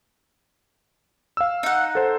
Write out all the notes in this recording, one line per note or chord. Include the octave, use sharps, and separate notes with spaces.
F5 E6
D#4 F#5
A4 C5